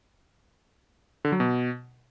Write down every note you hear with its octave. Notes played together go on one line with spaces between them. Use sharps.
D3
F#3
B2